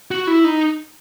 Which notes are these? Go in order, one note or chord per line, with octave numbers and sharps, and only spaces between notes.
F#4
E4
D#4